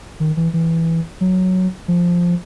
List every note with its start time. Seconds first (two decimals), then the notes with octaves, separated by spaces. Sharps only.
0.20 D#3
0.37 E3
0.54 E3
1.21 F#3
1.88 F3